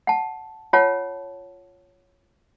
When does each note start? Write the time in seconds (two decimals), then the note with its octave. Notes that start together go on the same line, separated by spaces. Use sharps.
0.07 F#5 A5
0.73 F4 C#5 F#5 A5